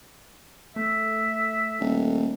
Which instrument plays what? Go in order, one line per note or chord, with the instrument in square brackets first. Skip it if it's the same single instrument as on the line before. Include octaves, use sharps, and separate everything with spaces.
[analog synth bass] A3 [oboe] E5
[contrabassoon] D#1